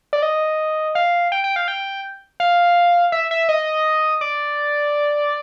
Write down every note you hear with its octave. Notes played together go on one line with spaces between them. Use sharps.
D5
D#5
F5
G5
G5
F5
G5
F5
E5
E5
D#5
D5